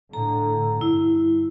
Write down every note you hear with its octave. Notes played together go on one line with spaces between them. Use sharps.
A2 D3 A#5
G2 E4